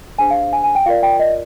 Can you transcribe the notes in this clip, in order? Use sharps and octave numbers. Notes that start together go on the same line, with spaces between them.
D4 G#4 C5 G#5
F5
F5
G#5
G#5
G5
F4 A#4 D5 F5
G5
D#5